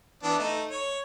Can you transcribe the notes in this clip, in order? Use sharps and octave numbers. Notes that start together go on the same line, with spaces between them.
E3 B3 D4
A3 D#4
C#5